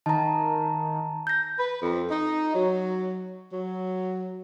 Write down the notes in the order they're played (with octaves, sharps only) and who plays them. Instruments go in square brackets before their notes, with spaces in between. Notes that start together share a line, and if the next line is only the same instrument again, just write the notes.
[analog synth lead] D#3 [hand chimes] A5 A#5
[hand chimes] G6 A#6
[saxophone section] B4
F2
D#4
F#3
F#3